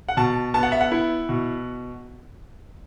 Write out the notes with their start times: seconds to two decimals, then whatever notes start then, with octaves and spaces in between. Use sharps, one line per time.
0.09 F#5
0.17 B2 A5
0.54 B3 A5
0.63 F#5
0.72 E5
0.81 F#5
0.92 E4
1.29 B2